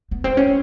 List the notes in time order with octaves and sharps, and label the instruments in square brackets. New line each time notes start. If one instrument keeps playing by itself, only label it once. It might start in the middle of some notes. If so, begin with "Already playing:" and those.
[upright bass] B3
C4
C#4